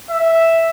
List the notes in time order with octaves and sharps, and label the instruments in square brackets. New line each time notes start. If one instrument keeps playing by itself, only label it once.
[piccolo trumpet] E5